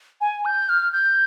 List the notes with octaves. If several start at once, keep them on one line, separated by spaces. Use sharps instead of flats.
G#5
G6
F6
G6